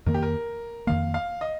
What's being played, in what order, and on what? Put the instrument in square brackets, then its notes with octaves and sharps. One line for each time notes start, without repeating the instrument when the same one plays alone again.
[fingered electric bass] F2 D#3 A#3 [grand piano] A#4
[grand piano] G4
A#4
[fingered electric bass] F2 D#3 A#3 [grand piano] F5
[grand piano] F5
D#5